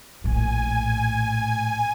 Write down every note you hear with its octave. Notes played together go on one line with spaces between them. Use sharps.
A#1 A2 G#5